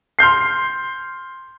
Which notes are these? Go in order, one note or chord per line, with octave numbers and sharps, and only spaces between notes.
C6 F6 G6 C7